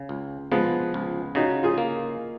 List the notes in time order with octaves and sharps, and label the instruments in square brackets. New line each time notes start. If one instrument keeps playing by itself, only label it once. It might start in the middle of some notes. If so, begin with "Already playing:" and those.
Already playing: [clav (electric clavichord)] C#3
C#2
[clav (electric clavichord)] F3 [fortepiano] G#3 B3
[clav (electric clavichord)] C#2
[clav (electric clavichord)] C#3 [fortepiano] D#4 F#4
[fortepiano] F4 G#4
[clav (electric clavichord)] A#3